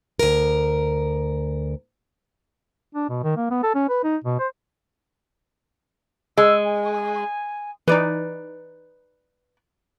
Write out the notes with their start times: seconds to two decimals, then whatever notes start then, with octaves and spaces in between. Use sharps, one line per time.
0.19 D2 A#4
2.95 D4
3.09 B2
3.23 D#3
3.37 A#3
3.50 B3
3.63 A4
3.75 C#4
3.89 B4
4.03 D#4
4.24 B2
4.39 C5
6.37 G#3 E6
6.65 G#5
7.88 E3 D#4 B4 D5